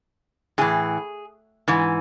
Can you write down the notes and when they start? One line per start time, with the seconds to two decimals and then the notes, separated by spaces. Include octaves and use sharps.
0.58 A2 E3 G#4
1.68 G#2 E3